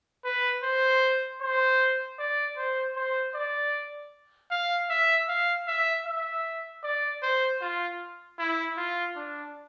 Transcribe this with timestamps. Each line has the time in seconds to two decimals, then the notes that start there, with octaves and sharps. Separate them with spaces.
0.25 B4
0.63 C5
1.41 C5
2.19 D5
2.57 C5
2.96 C5
3.35 D5
4.51 F5
4.90 E5
5.29 F5
5.67 E5
6.06 E5
6.84 D5
7.23 C5
7.61 F4
8.39 E4
8.77 F4
9.16 D4